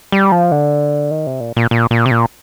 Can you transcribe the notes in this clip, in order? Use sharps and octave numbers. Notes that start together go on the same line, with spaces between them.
G3
F3
D3
D#3
C3
A#2
A#2
A#2
A#2
C3
A#2